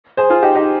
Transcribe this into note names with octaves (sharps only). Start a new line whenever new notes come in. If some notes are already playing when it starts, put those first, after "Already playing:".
G#4 C5
F4 G#4
D#4 G4
D#4 G4